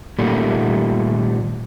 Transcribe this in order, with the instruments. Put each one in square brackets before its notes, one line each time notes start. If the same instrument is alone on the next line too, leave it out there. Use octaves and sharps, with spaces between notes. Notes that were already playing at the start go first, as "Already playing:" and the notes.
[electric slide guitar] A#2 D#3 G3 A3 A#3